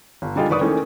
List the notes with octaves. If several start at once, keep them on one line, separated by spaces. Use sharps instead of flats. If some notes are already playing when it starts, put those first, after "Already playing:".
G1
D3 G3 G#3 D#4 F4
F#1 D#3 B4 D5 C#6 D#6
D#3 E3 A3 A#3 C#4